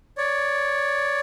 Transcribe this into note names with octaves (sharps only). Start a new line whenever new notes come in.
C#5 D5